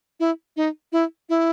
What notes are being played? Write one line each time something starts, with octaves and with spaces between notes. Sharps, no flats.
E4
D#4
E4
E4